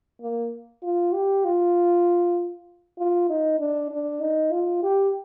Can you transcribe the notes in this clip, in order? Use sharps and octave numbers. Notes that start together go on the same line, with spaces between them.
A#3
F4
G4
F4
F4
D#4
D4
D4
D#4
F4
G4